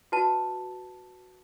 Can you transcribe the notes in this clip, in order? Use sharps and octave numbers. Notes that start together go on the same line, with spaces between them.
F#4 B4 A5